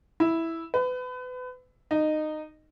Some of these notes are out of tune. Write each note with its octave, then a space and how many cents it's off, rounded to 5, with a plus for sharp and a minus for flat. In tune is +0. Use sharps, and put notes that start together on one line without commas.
E4 -5
B4 +30
D#4 -15